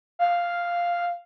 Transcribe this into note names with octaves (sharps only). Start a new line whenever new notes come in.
F5